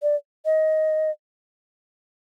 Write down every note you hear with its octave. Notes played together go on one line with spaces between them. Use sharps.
D5
D#5